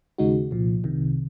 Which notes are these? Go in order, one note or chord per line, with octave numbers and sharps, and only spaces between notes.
D#2 C#3 G#3 D#4 F#4
C2 A#2 F3
C2 C3 D#3